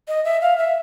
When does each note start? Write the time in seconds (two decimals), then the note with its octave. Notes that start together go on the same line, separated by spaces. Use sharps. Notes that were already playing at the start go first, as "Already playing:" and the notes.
0.08 D#5
0.25 E5
0.41 F5
0.58 E5